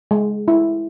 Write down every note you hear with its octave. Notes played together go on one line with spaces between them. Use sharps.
G#3
E4